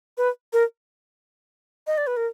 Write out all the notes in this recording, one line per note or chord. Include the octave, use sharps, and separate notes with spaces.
B4
A#4
D#5
D5
B4
A#4